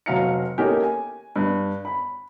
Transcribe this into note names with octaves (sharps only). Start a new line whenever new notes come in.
F1 F#3 F5 A#5 C#7
A#3 C#4 D#4 G4 A4 A#4
G#5
G2
B5